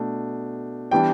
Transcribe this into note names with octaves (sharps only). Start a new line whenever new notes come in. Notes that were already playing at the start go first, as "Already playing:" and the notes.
Already playing: B2 A3 D4
E3 G3 B3 D4 G5